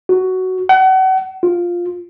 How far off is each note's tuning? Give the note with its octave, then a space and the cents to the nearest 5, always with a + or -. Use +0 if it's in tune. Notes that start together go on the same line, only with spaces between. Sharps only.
F#4 +10
F#5 +35
F4 +5